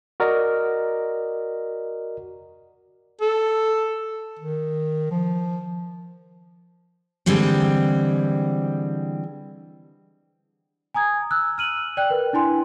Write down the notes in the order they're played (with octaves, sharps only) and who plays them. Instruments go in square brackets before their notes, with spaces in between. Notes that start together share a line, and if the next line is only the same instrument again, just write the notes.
[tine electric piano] F#4 A#4 D5 D#5
[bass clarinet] A4
D#3
F3
[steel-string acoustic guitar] D3 E3 G3 G#3 C4
[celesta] G#5 A#5 D#6 G#6
E6 F#6
F6 D#7 F#7
D5 G5 F#6
A#4 B4
D4 E4 G#5 C6